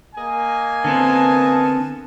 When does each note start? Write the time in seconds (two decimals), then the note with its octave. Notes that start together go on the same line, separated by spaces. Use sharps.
0.16 A#3 D#5 G#5
0.84 D3 B3 C4 A#4 B4 A5